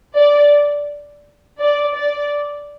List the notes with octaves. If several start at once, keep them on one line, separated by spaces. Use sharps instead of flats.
D5
D5
D5